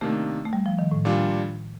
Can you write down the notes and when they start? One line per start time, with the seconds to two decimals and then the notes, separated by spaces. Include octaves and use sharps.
0.01 C3 D#3 A3 A#3 D4
0.45 A3
0.53 G3
0.66 F3
0.79 D#3
0.91 A2
1.05 A#2 G3 D4 F4